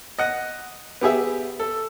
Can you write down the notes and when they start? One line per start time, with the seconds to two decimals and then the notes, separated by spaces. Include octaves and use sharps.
0.19 D#5 F#5
1.01 B3 G4 G#4 E5
1.59 A4